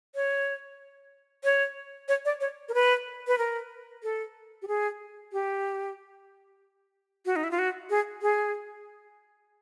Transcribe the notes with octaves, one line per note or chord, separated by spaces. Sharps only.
C#5
C#5
C#5
D5
C#5
A#4
B4
B4
A#4
A4
G4
G#4
G4
F#4
D#4
E4
F4
F#4
G#4
G#4